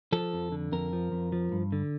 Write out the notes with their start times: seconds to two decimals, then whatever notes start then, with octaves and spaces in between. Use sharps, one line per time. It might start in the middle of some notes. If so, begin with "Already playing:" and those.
0.12 F3 A4
0.33 F2
0.52 D3
0.72 F2 A#4
0.93 F3
1.12 F2
1.32 F3
1.52 G2
1.72 D3